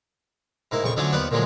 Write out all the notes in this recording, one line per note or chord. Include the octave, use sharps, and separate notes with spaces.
G#2 A#3 E4
A#1 F2 C#3 C#6
D3 F3 F#3 A3 C#4 D4
D#2 F3 B3 B4 D5 F#5
A#2 D3 F3 F#3 G#3